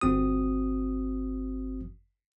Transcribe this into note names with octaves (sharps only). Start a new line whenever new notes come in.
G1 C4 F#4 D#6